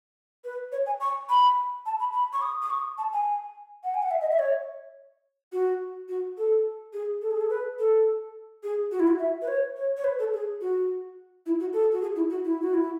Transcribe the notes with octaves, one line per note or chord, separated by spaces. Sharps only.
B4
C#5
G#5
C#6
B5
A5
B5
B5
C#6
D#6
D#6
C#6
A5
G#5
F#5
G#5
F#5
E5
D#5
E5
C#5
F#4
F#4
A4
G#4
A4
G#4
A4
B4
A4
G#4
F#4
E4
F#4
E5
B4
C#5
C#5
C#5
B4
A4
G#4
F#4
E4
F#4
A4
F#4
G#4
E4
F#4
E4
F#4
E4